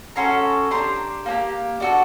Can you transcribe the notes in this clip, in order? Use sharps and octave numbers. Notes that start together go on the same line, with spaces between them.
C#4 F#4 A4 A#5 C6
D4 G4 A#5 C6
A#3 D4 G4
D4 F#4 A4